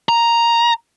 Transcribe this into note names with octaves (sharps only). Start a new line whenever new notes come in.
A#5